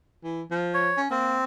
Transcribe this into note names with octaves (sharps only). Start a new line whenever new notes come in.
E3
F3
C#5
C#4
A#3 C4